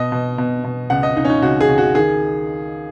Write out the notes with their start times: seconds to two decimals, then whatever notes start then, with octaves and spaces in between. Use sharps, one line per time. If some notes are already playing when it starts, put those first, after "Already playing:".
Already playing: B2 D#5
0.12 B2
0.38 B2
0.64 B2
0.90 C#2 F#5
1.03 D#5
1.16 C#2 D#4
1.25 C#4
1.30 D#4
1.42 C#2 F#4
1.61 G#4
1.69 C#2
1.78 F#4
1.95 D#3 G#4